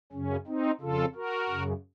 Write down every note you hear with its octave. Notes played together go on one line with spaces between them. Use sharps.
F#2 C#3 C#4
C4 D#4
F2 C#3 F4 A4
F#4 A#4
F#2 C#3